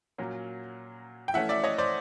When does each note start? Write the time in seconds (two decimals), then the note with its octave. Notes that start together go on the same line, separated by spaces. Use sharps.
0.18 A#2 F#3 A#3 C#4
1.28 G5
1.34 E3 A3 C#4 E5 F#5
1.49 D5 E5
1.64 C#5 D#5
1.78 C5 D5